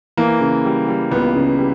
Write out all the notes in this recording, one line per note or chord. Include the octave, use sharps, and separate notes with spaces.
E3 A#3
C#3
G3
G3
C#2 B3
C#3
G3